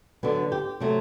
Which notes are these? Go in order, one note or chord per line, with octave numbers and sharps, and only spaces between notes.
D3 F#3 B3
G4
C3 F#3 A3